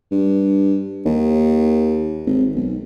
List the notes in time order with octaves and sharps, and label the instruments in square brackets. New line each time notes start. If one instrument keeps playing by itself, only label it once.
[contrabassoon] G2
D#2
G#1
B1